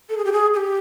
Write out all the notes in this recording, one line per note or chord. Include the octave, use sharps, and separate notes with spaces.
A4
G#4
G4
G#4
G#4
G4